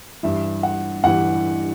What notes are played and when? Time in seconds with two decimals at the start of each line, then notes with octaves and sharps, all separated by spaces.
0.23 G2 E3 E5
0.63 F#5
1.04 G2 E3 F#5